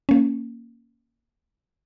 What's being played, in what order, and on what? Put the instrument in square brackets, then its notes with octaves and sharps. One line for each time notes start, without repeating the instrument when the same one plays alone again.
[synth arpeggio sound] A#3 C#4